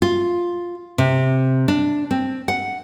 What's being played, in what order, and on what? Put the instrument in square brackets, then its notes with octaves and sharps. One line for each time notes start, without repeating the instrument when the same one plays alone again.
[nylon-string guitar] F4
C3
D4
C4
F#5